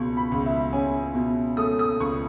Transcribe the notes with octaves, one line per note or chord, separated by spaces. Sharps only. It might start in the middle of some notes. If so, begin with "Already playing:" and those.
Already playing: C#2 B2 C#6
B5
C#2
E5
C#4 G#5
B2
A3 D#6
D#6
C#2 C#6